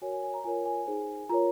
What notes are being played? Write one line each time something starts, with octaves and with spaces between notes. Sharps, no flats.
F#4 A#4 C#5 G#5
G#5
G#5
A#5
F4 A#4 C#5 G#5
G#5
D#4 G#4 C5
F4 A#4 C#5 A#5